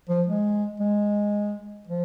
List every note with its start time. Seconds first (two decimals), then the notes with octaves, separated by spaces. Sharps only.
0.09 F3
0.27 G#3
0.80 G#3
1.87 F3